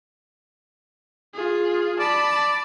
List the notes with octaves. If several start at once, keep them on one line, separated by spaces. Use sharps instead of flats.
F4 G#4
D5 A5 B5